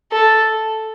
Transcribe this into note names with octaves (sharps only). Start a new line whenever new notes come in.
A4